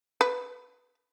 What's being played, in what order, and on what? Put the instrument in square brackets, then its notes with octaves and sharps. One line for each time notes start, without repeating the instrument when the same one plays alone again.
[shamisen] B4